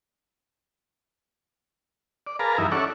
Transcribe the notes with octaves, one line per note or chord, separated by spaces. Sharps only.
D5
G#4 A#4 B4 F5 A5 A#5
G2 E3 D#4 E4
C#4 E4 A4 D5 F#5 C#6